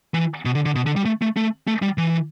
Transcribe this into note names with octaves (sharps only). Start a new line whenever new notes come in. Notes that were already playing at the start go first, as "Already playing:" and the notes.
E3
B2
D3
D3
B2
D3
G3
A3
A3
A3
A3
G3
E3